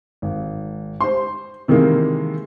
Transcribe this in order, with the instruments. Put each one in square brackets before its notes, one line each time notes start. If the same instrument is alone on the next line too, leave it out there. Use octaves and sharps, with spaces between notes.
[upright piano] G#1
C5 C6
C3 D#3 E3 G#3 A#3